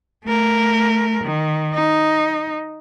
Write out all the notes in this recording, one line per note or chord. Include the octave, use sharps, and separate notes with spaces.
A3 A#4
D#3
D#4